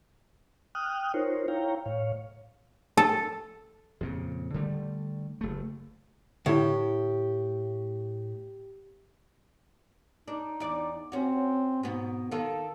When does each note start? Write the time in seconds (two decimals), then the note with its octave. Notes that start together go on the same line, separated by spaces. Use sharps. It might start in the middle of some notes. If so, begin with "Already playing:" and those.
0.75 G5 D#6 F6 F#6
1.14 D#4 F4 A#4 C5 C#5
1.48 E4 C#5 F5 G5 A#5
1.86 A2 C#5 F5
2.97 A4
4.01 F2 A#2 C#3
4.54 D3 G3 A3
5.41 F#1 A3
6.46 A2 D3 E4 G4
10.28 D4 D#4
10.60 E2 D5
11.12 C4 C#4 F#4
11.83 G#2 B2 B3
12.31 D#3 F4 A4